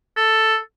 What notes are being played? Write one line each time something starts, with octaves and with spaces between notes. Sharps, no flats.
A4